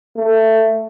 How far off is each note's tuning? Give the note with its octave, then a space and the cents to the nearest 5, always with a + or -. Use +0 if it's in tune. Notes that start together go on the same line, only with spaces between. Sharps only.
A3 +15